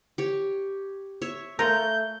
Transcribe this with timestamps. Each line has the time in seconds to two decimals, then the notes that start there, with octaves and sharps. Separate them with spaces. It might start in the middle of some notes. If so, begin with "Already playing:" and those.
0.18 G4 C#5
1.22 C#5 E5
1.59 A3 F4 A#4 C#5 G6